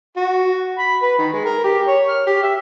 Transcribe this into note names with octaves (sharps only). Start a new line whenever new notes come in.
F#4
B5
B4
D#3
G#3
A#4
G4
C#5
F6
G4
E5